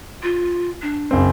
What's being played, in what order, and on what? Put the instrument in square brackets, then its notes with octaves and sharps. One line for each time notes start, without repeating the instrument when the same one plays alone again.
[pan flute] F4
D4
[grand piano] F#1 C4